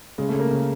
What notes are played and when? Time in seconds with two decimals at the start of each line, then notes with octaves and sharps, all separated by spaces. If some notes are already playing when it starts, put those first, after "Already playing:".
0.18 C#3 G#3
0.29 A3
0.34 C#3
0.40 A#3
0.51 C#3